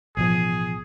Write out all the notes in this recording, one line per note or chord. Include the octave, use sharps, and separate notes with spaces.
A1 B2 F3 G#4